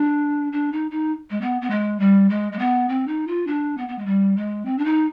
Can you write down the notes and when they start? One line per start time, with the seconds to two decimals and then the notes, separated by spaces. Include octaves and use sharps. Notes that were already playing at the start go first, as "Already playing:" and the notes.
Already playing: D4
0.52 D4
0.72 D#4
0.91 D#4
1.30 G#3
1.41 B3
1.61 B3
1.70 G#3
2.00 G3
2.30 G#3
2.52 G#3
2.59 B3
2.89 C4
3.07 D#4
3.27 F4
3.47 D4
3.77 B3
3.88 B3
3.98 G#3
4.06 G3
4.37 G#3
4.65 C4
4.78 D4
4.85 D#4